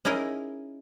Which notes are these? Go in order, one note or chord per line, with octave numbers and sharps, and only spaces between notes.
C#4 D#4 E4 G#4 A#4 D#5